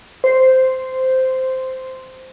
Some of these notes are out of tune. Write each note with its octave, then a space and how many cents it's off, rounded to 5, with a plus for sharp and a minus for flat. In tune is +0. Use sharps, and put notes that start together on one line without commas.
C5 -10